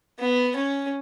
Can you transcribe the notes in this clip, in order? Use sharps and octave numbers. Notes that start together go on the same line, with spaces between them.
B3
C#4